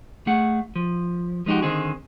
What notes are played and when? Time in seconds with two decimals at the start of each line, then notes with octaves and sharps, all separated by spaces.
0.27 A3 G#4 F#5
0.76 F3
1.46 F3 G#3 D#4 F#4 G4
1.62 D3 D#3 C4 D#4 G#4